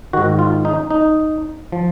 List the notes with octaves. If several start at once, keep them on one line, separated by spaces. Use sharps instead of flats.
G#2 D#3 F#4
F4
D#4
D#4
F3